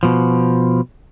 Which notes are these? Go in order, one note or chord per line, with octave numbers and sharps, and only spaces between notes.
B2 F3